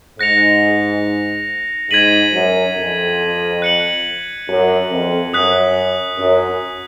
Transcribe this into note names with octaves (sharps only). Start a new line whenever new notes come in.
G#2 F#6 A#6 C#7 F7
G#2 G#6 B6 D#7 F#7
F#2
F2
F#6 C#7 F#7
F#2
F2
F#2 D#6 F#6 B6 F#7
F#2